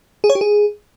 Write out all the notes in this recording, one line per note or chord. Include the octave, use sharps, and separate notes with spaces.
G#4
C#5
G4
G#4